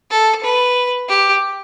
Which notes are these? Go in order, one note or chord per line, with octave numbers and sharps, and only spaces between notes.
A4
B4
G4